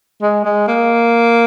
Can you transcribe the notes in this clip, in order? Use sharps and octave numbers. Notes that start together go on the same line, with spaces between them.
G#3
G#3
A#3